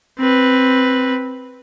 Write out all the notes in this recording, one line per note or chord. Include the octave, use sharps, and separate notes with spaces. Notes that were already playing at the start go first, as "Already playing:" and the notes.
C4 B4